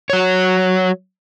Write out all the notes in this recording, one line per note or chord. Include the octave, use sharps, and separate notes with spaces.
F#3 C#5